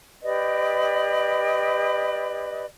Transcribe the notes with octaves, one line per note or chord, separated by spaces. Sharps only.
G4 B4 D5 D#5